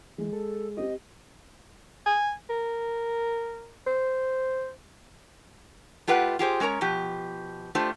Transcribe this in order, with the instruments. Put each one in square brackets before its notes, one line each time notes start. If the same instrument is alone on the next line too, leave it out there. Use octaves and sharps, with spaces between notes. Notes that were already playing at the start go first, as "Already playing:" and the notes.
[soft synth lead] E3 [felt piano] G#3 G#4
[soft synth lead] A4
[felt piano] C4 G4 [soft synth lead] D#5
[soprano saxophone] G#5
A#4
C5
[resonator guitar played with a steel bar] A3 F4 G4 B4 F#5
F4 G4 G#4 C5
G#3 C#4 A#4 C#5 A#5
B2 F3 G4
A3 D4 F4 G4 C5